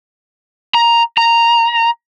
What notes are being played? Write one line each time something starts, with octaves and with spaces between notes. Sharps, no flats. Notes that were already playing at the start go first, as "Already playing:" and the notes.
A#5
A#5